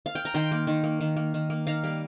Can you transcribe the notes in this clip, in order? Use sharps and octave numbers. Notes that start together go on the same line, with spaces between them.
F5
G5
A#5
D#3 G5 C6
A#3
D#3
A#3
D#3
A#3
D#3
A#3
D#3 F5 A#5
G3 A#3